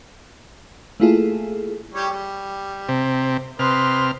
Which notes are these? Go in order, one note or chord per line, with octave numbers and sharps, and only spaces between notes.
A3 A#3 E4 F4 G#4 A4
G3 G4 C#5
G3
C3
C3 B4 D#5 C6 F6